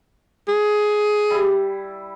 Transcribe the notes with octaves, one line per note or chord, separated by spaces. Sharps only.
G#4
G3 E4